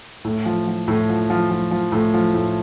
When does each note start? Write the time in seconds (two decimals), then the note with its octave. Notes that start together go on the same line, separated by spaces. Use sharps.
0.25 A2
0.46 F3
0.67 F3
0.88 A2
1.09 F3
1.30 F3
1.50 F3
1.71 F3
1.92 A2
2.14 F3
2.35 A2